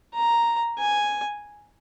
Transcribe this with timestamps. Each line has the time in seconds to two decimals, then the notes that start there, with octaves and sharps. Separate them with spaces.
0.14 A#5
0.79 G#5